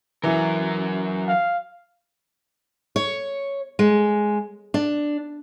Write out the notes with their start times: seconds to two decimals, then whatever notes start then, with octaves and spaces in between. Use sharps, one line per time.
0.23 E3 F#3 A#4
1.28 F5
2.96 C#5
3.79 G#3
4.74 D4